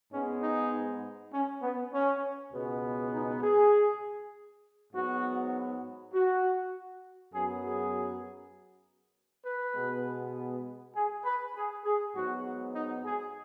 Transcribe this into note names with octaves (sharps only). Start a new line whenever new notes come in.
G#2 G#3 B3 C#4
D#4
C#4
B3
C#4
C#2 B2 G#3 B3
D#4
G#4
G#2 F#3 B3 F#4
F#4
F#2 F#3 B3 G#4
G#4
B4
B2 G#3 B3
G#4
B4
G#4
G#4
G#2 F#3 B3 F#4
D#4
G#4